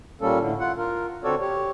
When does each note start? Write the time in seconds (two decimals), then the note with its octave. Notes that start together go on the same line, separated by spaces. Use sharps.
0.21 A#2 G3 A#3 C#4 A4
0.40 A2 D3
0.60 F4 F#5
0.77 F4 A#4
1.24 D3 C4 F#4 A4 C#5 D5
1.41 G4 C#5